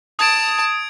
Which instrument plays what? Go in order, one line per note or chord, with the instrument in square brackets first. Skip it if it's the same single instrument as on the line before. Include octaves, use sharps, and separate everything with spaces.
[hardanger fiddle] A5 [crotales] D#6 G#6 D7